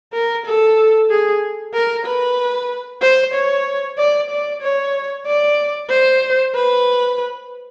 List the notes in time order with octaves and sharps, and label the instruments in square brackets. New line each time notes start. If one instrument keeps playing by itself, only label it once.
[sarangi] A#4
A4
G#4
A#4
B4
C5
C#5
D5
D5
C#5
D5
C5
B4